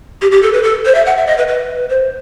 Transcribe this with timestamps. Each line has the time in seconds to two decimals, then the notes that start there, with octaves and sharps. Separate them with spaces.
0.22 G4
0.32 G4
0.43 A4
0.53 B4
0.63 A4
0.85 C5
0.95 E5
1.06 F#5
1.17 E5
1.27 D#5
1.38 B4
1.48 B4
1.89 C5